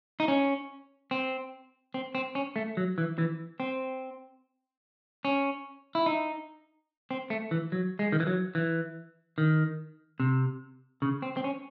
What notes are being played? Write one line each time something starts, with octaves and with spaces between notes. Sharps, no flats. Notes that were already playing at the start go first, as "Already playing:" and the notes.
D#4
C#4
C4
C4
C4
C#4
A3
F#3
E3
E3
C4
C#4
E4
D#4
C4
A3
E3
F#3
G#3
D#3
E3
F#3
E3
D#3
C3
C#3
C4
C4
C#4